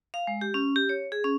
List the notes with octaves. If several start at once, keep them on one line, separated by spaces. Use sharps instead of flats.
F5
G#3
G4
C#4
G4
C#5
G#4
C#4